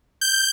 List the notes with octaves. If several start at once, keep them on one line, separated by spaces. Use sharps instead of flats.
G6